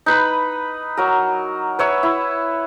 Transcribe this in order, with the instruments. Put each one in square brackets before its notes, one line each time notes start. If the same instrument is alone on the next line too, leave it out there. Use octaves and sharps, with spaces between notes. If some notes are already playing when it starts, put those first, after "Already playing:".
[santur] D#4 B4 B5
F#3 A#4
B4 C#5 E5
E4